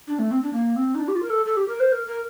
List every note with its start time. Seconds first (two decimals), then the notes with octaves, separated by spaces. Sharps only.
0.08 D4
0.19 A3
0.31 C4
0.43 D4
0.53 A#3
0.76 C4
0.95 D#4
1.00 D4
1.08 G4
1.15 F4
1.23 A#4
1.30 A4
1.46 A4
1.57 G4
1.68 A#4
1.80 C5
1.92 A#4
2.07 A#4